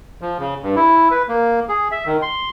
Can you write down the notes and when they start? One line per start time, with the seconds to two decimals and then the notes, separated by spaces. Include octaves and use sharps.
0.21 F3
0.39 C#3
0.63 G2
0.76 E4
1.11 B4
1.29 A#3
1.69 G#4
1.91 E5
2.06 D#3
2.22 C6